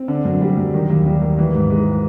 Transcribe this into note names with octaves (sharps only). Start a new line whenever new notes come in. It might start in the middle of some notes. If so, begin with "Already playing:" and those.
Already playing: C4
D3
F#2
G3
F#2
D#3
D#2
G3
D#2
E3
G#2
G#3